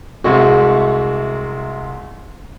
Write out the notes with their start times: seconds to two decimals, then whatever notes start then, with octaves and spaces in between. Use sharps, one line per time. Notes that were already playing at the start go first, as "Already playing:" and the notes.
0.24 C2 C3 G#3 F#4